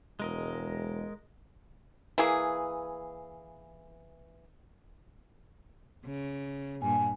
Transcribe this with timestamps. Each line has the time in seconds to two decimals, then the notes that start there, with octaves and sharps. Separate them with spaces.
0.20 E1 G#3 A#4 D#5
2.18 E3 A#3 G#4
6.05 C#3
6.82 G2 A#2 G#5